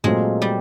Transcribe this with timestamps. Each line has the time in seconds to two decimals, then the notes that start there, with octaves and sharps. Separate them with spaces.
0.04 A#2 F#3 G#3 A3 C4 F4
0.42 G3